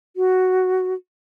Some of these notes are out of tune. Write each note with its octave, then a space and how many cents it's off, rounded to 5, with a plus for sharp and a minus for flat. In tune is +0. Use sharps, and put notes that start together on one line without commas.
F#4 +5